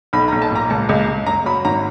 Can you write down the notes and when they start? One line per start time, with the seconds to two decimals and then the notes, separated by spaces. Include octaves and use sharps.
0.13 B1 B5
0.28 A#5
0.32 B1
0.42 A5
0.51 A#2 A#5
0.70 C#2 A5
0.89 C#2
1.08 C#2
1.26 F#2 A#5
1.46 F#3 B5
1.65 G#1 A#5